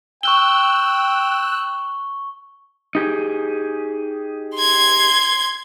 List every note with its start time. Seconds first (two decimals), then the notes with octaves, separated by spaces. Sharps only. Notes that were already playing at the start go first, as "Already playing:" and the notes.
0.23 G5 C#6 E6 F#6 G7
2.95 D#4 G4 G#4
4.56 C6 G#6